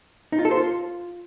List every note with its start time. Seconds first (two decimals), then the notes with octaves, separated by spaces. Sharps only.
0.32 D#4
0.39 F4
0.45 A4
0.51 C5
0.57 F4